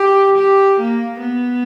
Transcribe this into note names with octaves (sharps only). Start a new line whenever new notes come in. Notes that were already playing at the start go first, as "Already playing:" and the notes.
Already playing: G4
G4
A#3
B3